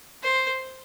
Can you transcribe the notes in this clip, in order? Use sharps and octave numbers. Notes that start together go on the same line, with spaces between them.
C5